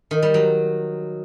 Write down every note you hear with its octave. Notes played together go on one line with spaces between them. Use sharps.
D#3
G3
F#3